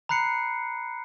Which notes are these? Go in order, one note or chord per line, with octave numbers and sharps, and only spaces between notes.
A#5 B5 F#6 C7 C#7